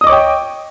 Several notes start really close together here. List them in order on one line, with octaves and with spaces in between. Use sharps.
D#6 D#5 D6 C#5 G5